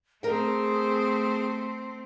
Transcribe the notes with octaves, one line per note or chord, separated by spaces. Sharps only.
A3 C4 G#4 A#4 G5